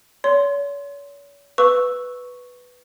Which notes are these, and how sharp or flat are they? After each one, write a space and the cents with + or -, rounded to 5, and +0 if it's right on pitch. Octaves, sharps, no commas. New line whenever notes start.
C#5 +40 C6 +0
B4 +0 C#6 +0 E6 -5